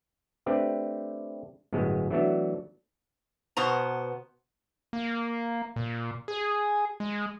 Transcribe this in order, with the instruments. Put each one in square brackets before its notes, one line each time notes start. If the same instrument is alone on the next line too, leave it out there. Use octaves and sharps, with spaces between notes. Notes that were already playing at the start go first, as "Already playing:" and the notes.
[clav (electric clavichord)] A3 C4 D4 G4 B4
G1 F#2 A2 G#3 B3
E3 F#3 A3 B3 D4 F#4
[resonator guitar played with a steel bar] B2 B3 C5 A#5
[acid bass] A#3
A#2
G#4
G#3